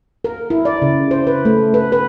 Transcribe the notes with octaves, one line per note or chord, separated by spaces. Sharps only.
A#4
E4
D5
C#3
C5
B4
A3
B4
B4